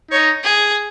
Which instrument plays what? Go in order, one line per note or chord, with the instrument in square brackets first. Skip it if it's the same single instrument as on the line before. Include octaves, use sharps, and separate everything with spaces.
[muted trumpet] D#4 [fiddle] C#5
[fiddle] G#4